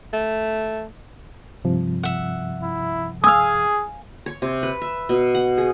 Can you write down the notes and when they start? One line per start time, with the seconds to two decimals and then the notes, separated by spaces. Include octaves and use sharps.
0.13 A3
1.64 G2 C3 F3
2.03 E5 F#5
2.63 E4
3.24 G#4 F5 G#5 D#6 E6
4.26 C#5
4.42 C3
4.63 B4
4.81 E5
5.09 B2
5.35 F#5
5.58 G#4